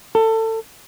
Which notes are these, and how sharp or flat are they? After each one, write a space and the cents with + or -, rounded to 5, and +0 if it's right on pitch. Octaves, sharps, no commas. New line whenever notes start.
A4 +25